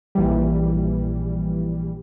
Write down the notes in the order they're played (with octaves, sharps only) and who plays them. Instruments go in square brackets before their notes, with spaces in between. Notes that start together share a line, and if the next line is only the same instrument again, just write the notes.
[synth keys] A#1 E3 G3